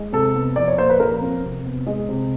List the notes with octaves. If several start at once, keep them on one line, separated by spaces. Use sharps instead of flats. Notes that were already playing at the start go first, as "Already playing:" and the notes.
Already playing: G#3
C3 A4
B3
F3 D5
C#5
A#2 C5
B4
F3 A#4
C4
C3
B3
G#3
C3